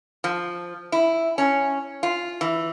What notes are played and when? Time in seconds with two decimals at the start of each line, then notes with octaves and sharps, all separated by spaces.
0.24 F3
0.92 E4
1.38 C#4
2.03 F4
2.41 E3